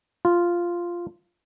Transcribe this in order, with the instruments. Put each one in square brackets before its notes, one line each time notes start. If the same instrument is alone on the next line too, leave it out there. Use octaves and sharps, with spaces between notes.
[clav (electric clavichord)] F4